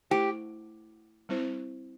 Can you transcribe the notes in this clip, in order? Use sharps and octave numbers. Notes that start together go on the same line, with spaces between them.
A3 E4 G4 C5
G3 C4 E4 C5